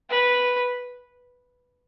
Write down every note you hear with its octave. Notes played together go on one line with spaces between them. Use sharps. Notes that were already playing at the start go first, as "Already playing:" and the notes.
B4